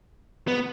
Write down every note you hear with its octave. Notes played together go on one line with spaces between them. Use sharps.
B3